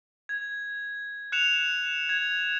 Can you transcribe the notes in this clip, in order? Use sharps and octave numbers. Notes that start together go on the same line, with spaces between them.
G#6
F#6 C#7 E7 F7
G#6